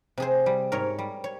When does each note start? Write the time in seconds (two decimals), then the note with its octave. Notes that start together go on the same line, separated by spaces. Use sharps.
0.17 C3 G#4 C5
0.46 G3
0.72 G#2 A#4 C#5
0.98 G3
1.24 C#5